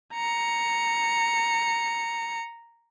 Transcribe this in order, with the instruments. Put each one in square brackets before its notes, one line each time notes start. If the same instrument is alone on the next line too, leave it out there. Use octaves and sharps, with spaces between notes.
[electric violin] A#5 C#7